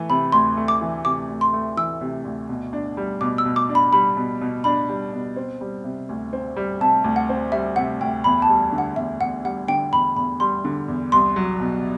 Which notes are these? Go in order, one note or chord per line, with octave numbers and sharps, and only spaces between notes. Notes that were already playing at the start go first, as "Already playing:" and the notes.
Already playing: E3 A3
C3 B5
D2 C6
A3
D6
E3
C3 D6
D2
C6
A3
E3 E6
C3
D2
B2
D4
G3
B2 D6
E6
B2
D6
D4
B5
G3 B5
B2
B2
D4 B5
G3
B2
C4
G3
C3
D2
C4
G3
C3 A5
D2
F#5
C4
G3 E5
C3 F#5
D2 G5
E2 B5
A5
G3
D3
F#5
E2 E5
E2 F#5
G3 F#5
D3 G5
E2 B5
E2 B5
G3 C6
D3
E2
C2 C6
F#3
B2